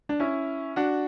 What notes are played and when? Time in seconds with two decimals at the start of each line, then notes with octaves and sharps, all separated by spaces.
0.09 D4
0.20 C#4 E4
0.76 D4 F#4